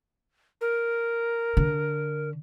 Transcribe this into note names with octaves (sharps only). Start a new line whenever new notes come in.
A#4
D3